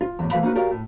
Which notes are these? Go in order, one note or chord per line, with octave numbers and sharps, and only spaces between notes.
F4
E2 A2
E3 A3 B4 F5 B5
A#3 D#4 F#4 B4
F#4 G4 A#4 D5 F5
A2